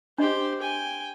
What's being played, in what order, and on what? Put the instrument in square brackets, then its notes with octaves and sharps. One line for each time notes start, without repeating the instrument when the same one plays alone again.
[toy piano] D4 D#5 [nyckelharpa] G4 C5
[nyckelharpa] G5 G#5